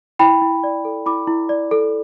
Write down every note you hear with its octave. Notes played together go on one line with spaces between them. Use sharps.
E4 G5 B5
E4
D5
A4
E4 B5 D6
E4
D5
A4